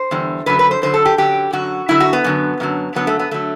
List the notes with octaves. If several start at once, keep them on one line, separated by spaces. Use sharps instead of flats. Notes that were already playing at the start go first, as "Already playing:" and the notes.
Already playing: C5
E2 D3 G3
F#2 D3 F#3 B4
B4
C5
F#2 D3 F#3 C5
A4
G4
F#2 D3 F#3 G4
F#2 D3 F#3 F#4
F#2 D3 F#3 E4
F#4
B3
F#2 D3 F#3
F#2 D3 F#3
F#2 D3 F#3 B3
A3
B3
D3 F#3 A3